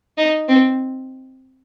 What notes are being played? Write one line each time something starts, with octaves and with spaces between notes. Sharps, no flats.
D#4
C4